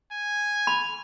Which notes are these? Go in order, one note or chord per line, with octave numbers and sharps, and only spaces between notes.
G#5
B5